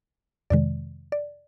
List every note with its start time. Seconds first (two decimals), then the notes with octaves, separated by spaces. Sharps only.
0.50 F2 C3 D#3 G#3 D5
1.12 D5